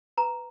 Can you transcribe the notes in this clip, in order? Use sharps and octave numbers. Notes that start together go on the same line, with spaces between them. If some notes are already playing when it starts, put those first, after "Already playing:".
B4 A#5